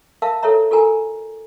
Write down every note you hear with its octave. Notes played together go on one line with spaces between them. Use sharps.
A#4 E5 F5 A5
A4 A#4 C#5 E5 A#5
F4 A4 A#4 G#5 A#5